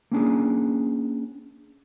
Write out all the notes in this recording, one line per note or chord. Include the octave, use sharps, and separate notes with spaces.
A#3 C#4 D4 G#4